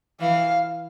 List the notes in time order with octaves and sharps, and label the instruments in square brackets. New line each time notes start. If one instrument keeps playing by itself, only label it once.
[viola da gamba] E3 [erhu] F5